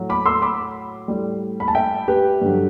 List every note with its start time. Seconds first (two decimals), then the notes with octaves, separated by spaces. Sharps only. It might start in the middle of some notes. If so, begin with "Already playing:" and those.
Already playing: A2 F#3
0.10 B5 D6
0.26 C6 E6
0.42 B5 D6
1.08 A2 G3
1.60 B5
1.68 A5
1.75 E5 G5
2.08 G4 B4
2.41 G2 D3 F#3